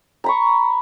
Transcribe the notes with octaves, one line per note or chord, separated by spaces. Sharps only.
A#5 B5 C#6